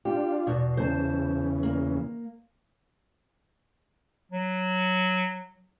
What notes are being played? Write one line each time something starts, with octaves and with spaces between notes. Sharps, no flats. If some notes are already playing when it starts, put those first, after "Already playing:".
D4 F4 G4
E2 B2
E2 C#3 C5 A5
A#3
F#3